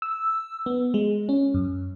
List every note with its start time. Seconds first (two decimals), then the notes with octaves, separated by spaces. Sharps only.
0.02 E6
0.66 B3
0.94 G#3
1.29 C#4
1.54 F#2